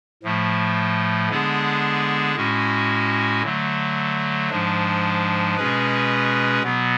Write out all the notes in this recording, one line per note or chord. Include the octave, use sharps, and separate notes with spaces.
A2 F3 A3
D3 G#3 B3 D4 G#4
A2 G#3 C#4 F#4
D3 F#3 A3
G#2 F3 G#3 D4
B2 G#3 C#4 G#4 B4
B2 F#3 B3